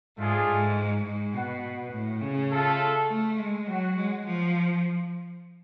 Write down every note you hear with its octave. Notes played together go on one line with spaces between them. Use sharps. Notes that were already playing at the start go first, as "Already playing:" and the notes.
G#2 A3 D4 F4 G#4
G#2
G#2
B2 F#4 B4 F#5
A2
C#3
A3 F4 A4
A3
G#3
F#3 F#4 C#5 F#5
G#3
F3